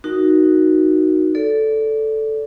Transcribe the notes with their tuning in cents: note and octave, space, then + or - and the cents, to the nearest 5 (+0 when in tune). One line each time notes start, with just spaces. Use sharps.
D#4 +0 F#4 +0 A#4 +0
A4 -5 D5 -20